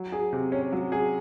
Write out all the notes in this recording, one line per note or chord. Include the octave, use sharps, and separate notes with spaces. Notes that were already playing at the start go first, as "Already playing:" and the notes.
Already playing: F#3
G#4
C3
C#4
F#3
G#4